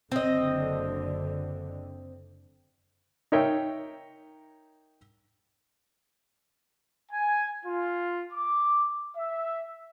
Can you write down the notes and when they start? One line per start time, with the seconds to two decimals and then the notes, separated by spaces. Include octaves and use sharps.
0.11 F#1 D3 C4 D#5
3.32 D#4 A#4 C#5 E5 G5
7.11 G#5
7.65 F4
8.32 D6
9.16 E5